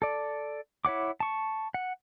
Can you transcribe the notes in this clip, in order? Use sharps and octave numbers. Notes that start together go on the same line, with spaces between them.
A4 D5
E4 C#5 F#5 D6
A5 C#6
F#5